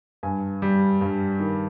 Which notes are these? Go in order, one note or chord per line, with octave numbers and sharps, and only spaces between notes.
G2 G#5
G3
G2
D#3